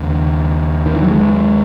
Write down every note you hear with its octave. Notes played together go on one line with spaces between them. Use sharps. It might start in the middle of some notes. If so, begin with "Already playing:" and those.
Already playing: D#2 C#3
D#3
E3
F#3
G#3